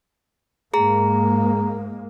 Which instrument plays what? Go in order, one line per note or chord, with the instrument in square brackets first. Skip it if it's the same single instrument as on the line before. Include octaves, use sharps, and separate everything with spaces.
[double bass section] G#2 G#3 A#3 [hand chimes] G#4 A#5